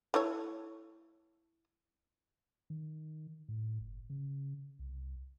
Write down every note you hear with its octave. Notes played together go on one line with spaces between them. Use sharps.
A3 E4 C#5
D#3
A2
F#1
C#3
C2